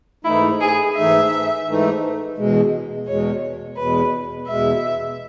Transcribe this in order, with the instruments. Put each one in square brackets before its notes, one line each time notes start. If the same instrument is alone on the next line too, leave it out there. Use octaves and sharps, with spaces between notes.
[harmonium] G#2 E3 A3 D#4 [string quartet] E4
[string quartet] G#4
[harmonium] G#2 E3 A3 D#4 [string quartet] E5
[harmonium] G#2 E3 A3 D#4
E2 B2 G#3
[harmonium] E2 B2 G#3 [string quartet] C#5
[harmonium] E2 B2 G#3 [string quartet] B4
[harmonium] E2 B2 G#3 [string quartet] E5